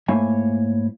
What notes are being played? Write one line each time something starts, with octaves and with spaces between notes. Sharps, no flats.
G#2 A3 A#3 E4 C#5 G#5